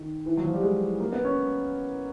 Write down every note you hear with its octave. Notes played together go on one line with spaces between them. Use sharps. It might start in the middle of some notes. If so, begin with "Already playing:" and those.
Already playing: D#3
E3
F#3
F3
G3
G#3
A#3
B3
C#4